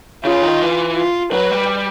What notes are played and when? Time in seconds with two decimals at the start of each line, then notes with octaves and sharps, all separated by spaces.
0.24 C#3 F4
0.43 D#3
0.62 E3
0.97 F4
1.33 F#3 B4
1.51 G3